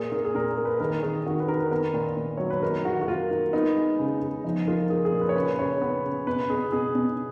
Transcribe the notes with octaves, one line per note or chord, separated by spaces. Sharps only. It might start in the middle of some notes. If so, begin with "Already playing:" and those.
Already playing: A#2 A#3 G#4
A#3
G#4
A#2 A#4
A#3
B4
D#3 A#4
D#3 G#4
D#3 F#4
B4
D#3 A#4
B4
B3 A#4
A#2
A#2
F#3 C#5
B4
D#3 A#4
D#3 F#4
F#4
A#3 F4
A#3
B3 D#4
G#3
C#3
C#3
F3 D#4
A#3 F4
A#3 G#4
G#4
A#2
B4
C#5
C#3 B4
C#3 C#5
B3
C#3
B2 B4
B2 G#4
B2 G#4
B2